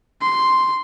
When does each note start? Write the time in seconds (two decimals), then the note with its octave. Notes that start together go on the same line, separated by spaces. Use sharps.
0.21 C6